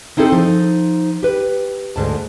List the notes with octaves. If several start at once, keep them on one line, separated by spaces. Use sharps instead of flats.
C4 D#4 E4 G#4 A4
F3 D#4
G4 B4
D2 G#2 A5